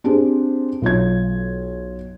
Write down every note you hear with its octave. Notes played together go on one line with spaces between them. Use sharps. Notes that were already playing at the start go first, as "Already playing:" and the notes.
C4 D4 G4 G#4 C5
B1 F4 C#5 G#6